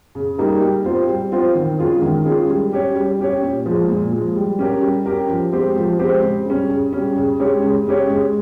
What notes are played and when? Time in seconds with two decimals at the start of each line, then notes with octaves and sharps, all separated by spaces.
0.15 C#3
0.38 G3 A#3 D#4 A#4
0.62 G3
0.85 C4 F4 C5
1.08 G3
1.32 C4 F4 C5
1.55 D#3
1.78 G#3 C#4 F4 G#4
2.02 D#3
2.25 G#3 C#4 F4 G#4
2.49 G3
2.72 C#4 G4 C#5
2.95 G3
3.19 C#4 G4 C#5
3.42 A#2
3.66 F3 G#3
3.89 A#2
4.12 F3 G#3
4.36 G3
4.59 C#4 G4 A#4
4.82 G3
5.06 C#4 G4 A#4
5.29 F3
5.52 G#3 C4 G4 C5
5.76 F3
5.99 G#3 C4 G4 C5
6.22 C#3
6.46 G3 C#4
6.70 C#3
6.93 G3 C#4
7.16 C#3
7.40 G#3 C#4 G4 C#5
7.63 C#3
7.86 G#3 C#4 G4 C#5
8.10 G#3